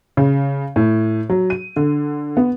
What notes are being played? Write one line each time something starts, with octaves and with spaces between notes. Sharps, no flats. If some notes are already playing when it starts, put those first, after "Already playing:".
C#3
A2
F#3
D#7
D3
B3